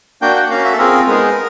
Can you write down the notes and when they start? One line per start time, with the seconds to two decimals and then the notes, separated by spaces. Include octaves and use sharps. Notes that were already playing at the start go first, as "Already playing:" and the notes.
0.21 A#3 D4 F#4 G5
0.35 F#5
0.50 A#3 C#4 F#4 F5
0.65 E5
0.73 A4
0.78 C4 F4 G#4 A#4
1.07 G#3 B3 D#4 G#4 A#4